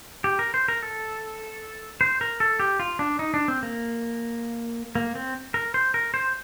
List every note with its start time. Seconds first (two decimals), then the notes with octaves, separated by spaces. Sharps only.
0.24 G4
0.39 A#4
0.54 C5
0.68 A#4
0.83 A4
2.01 C5
2.21 A#4
2.40 A4
2.60 G4
2.80 F4
2.99 D4
3.19 D#4
3.34 D4
3.48 C4
3.63 A#3
4.95 A#3
5.15 C4
5.54 A#4
5.74 C5
5.94 A#4
6.14 C5